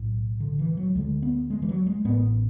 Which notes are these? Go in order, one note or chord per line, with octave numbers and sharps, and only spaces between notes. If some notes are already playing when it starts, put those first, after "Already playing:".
Already playing: B1 A2
D3
E3
F#3
D2 D3 G#3
B3
G#3
E3
F#3
G#3
A1 A2 B3